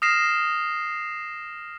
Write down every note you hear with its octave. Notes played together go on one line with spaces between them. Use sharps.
D#6 F6 A#6 C7 E7